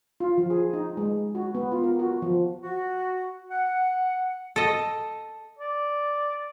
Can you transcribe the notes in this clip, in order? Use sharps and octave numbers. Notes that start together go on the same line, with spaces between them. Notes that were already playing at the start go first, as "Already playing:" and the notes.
F4
F3
G#4
D#4
G#3
F#4
B3
F4
A#4
F#4
F3
F#4
F#5
A4 D#5
D5